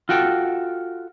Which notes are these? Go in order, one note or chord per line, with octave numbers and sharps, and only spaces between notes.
F4 F#4 A4 G5